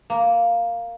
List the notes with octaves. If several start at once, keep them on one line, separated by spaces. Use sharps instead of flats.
A#3